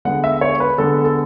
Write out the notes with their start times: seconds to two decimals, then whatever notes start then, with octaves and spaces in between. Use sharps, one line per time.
0.05 D3 G#3 B3 F#5
0.24 E5
0.41 C#5
0.60 B4
0.78 D3 G#3 B3 A4
1.04 A4